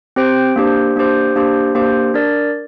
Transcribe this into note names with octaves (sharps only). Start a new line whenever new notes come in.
C4 G4 C5 G5
A#3 D4 G4 C5
A#3 D4 G4 C5
A#3 D4 G4 C5
A#3 D4 G4 C5
D4 A#4 D5